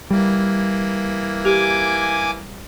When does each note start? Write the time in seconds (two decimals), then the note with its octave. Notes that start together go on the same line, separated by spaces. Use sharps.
0.11 E3 G3 A#3
1.45 G4 G#5 D6